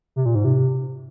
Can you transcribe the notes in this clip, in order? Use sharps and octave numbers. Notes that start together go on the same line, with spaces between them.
C3
A#2
G#2
C3